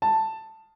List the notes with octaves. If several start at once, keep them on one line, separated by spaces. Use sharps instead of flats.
A5